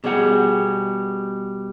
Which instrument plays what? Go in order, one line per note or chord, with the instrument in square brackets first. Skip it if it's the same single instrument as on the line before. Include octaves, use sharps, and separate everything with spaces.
[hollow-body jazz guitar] B2 G3 G#4 F#5